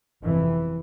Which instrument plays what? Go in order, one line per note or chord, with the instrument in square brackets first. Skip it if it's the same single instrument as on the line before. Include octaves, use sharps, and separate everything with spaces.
[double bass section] G1 F2 C3 E3